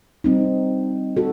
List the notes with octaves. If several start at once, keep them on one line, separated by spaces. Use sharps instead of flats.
G3 C4 D#4
F#4 A4